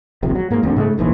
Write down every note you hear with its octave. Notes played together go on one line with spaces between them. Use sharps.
D#1 A#1 C3
F#3
G#2 A#3
E1 D2 D3 C4
G#2 C#3 G#3 A3
F1 A#1 D#2 E3